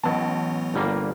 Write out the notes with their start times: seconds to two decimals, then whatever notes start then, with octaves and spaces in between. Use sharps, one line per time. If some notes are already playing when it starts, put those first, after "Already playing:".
0.03 A1 E3 F#3 B3 A5
0.74 G1 G3 A#3